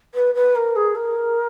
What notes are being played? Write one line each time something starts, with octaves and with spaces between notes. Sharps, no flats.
B4
B4
A#4
G#4
A#4